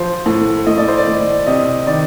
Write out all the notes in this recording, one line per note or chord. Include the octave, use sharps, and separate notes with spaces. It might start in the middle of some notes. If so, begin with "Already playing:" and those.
Already playing: F3 C5
A2
A2 D#5
D5
C5
D5
A2
C3 D#5
D#3 D5